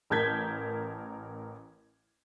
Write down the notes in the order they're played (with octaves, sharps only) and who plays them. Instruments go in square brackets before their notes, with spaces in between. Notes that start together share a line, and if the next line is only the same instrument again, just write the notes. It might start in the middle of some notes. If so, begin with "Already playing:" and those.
[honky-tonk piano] A1 A#4 A5 G6 G#6 B6